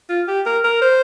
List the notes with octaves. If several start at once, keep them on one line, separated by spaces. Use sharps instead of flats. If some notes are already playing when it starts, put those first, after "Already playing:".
F4
G4
A#4
A#4
C5